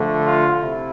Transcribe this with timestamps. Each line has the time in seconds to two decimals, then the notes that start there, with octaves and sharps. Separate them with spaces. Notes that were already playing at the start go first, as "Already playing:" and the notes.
Already playing: D3 F3 A3
0.23 F4
0.62 C3 E4